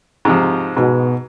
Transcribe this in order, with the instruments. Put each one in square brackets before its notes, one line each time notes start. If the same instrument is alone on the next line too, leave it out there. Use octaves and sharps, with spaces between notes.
[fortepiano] G#2 C3 F3
[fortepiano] G#2 [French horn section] B2